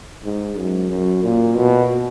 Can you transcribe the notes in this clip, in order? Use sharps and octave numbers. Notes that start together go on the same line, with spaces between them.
G#2
F#2
F#2
A#2
B2